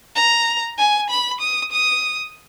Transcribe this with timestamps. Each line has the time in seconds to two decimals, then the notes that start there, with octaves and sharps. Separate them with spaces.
0.16 A#5
0.78 G#5
1.10 B5
1.41 D#6
1.72 D#6